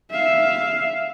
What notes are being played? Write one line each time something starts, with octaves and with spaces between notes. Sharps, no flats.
E5 F5